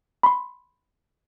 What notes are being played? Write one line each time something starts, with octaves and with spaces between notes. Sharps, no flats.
B5 C6